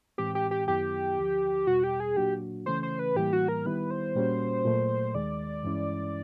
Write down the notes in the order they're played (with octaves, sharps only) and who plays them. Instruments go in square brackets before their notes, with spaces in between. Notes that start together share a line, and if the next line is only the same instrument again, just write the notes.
[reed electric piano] A2 E3 G#3 C4 [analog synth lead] G4
[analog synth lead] G4
G4
[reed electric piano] F#2 D#3 F#3 B3 E4 [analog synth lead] G4
[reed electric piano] D2 D3 F3
[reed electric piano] E2 B2 G3 [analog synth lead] F#4
[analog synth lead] G4
G#4
[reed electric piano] A#2 F#3 A#3 D4 F#4 [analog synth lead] G4
[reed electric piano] C#3 E3 A3 C#4 [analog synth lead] C5
[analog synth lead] C5
B4
[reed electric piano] A2 E3 G3 A#3 [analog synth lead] G4
[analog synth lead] F#4
A#4
[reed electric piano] D#3 G3 B3 E4 [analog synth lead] B4
[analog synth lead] C5
[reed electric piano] A#2 G3 A#3 C#4 F#4
A#2 F#3 A3
[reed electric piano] D#2 D#3 G#3 [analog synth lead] D5
[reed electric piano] G2 E3 G#3 C#4 E4